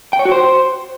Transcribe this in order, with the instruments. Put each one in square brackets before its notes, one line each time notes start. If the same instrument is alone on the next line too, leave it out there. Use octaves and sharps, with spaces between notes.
[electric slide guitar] G5
C#5
F#4
C5